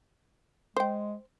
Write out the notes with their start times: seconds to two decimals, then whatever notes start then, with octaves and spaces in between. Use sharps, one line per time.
0.77 G#3 C5 G5